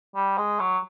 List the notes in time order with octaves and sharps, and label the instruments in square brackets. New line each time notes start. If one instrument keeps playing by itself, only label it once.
[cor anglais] G3
G#3
F#3